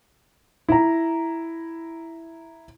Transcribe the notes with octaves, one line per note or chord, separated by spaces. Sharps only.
E4 A#5